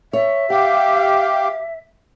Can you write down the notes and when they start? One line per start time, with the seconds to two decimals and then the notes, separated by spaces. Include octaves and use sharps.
0.13 C#5 E5
0.50 G4 F5 F#5